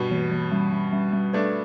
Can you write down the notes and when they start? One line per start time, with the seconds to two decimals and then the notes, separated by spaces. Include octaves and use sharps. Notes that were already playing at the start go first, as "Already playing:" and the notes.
Already playing: G2 B2
0.11 E3
0.32 E3
0.51 G3
0.72 G3
0.92 G3
1.13 G3
1.33 A3 D4 B4